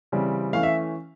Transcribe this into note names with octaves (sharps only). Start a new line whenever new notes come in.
C#3 E3 G3 C4
E3 A3 C#4 F5
E5